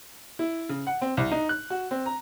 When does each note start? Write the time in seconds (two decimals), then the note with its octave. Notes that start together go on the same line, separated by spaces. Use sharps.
0.39 E4
0.69 C#3
0.87 F#5
1.01 C4
1.17 C2
1.31 D#4
1.49 F#6
1.70 F#4
1.91 C4
2.06 A#5